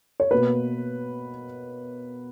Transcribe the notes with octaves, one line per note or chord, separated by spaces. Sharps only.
C#5
B2 A#3 B4